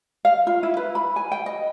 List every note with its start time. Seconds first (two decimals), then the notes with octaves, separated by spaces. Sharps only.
0.25 F5
0.47 F4
0.63 E4
0.77 B4
0.95 B5
1.16 G#5
1.32 G5
1.46 D#5